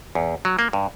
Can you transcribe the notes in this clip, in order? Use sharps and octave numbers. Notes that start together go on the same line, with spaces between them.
E2
F#3
A#3
G2